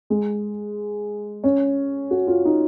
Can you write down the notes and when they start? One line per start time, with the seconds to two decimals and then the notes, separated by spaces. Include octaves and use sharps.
0.10 G#3
1.44 C#4
2.11 F#4
2.27 F4
2.45 D#4